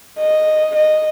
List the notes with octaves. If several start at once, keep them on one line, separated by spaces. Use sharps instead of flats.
D#5
D#5